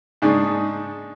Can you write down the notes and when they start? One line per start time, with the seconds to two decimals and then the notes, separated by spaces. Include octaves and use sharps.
0.22 G#2 C#3 D4 D#4